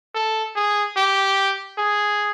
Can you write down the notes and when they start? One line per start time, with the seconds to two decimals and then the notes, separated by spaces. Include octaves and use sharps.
0.15 A4
0.56 G#4
0.97 G4
1.78 G#4